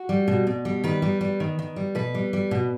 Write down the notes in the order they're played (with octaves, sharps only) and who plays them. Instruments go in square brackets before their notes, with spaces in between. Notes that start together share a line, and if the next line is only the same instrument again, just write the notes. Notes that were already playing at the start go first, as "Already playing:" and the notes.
Already playing: [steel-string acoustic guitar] F#4
G3
B2
B2
G3
D#3 B4
G3
G3
D#3
D#3
G3
B2 B4
G3
G3
B2